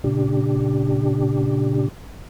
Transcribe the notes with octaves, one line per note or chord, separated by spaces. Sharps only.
A#2 C#3 D4 G4